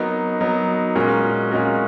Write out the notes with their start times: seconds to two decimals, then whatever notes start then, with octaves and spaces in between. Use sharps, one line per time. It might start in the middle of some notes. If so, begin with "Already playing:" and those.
Already playing: F#3 B3 D#4 A#4
0.40 F#3 B3 D#4 A#4
0.95 A#2 G#3 C#4 F#4 A#4
1.51 A#2 G#3 C#4 F#4 A#4